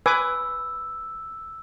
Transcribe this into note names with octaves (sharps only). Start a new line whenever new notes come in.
B4 G#5 D6 E6